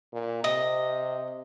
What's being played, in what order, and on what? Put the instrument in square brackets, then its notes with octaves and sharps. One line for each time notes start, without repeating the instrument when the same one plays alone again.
[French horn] A#2
[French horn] C3 [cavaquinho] D#5